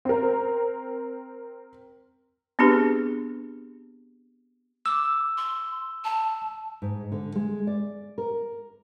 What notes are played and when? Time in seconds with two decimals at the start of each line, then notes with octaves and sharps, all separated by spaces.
0.05 C4 A#4
2.59 B3 C4 D4 G4 G#4 B4
4.86 D6 E6
5.37 C6
6.04 A5
6.82 G#2
7.12 D3
7.35 G#3
7.67 D5
8.18 A#4